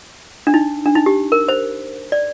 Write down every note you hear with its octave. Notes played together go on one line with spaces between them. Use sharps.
D4
D#4
D4
D#4
G4
A#4
C5
D5